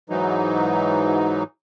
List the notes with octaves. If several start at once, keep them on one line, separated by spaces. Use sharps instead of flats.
G#2 E3 F#3 D#4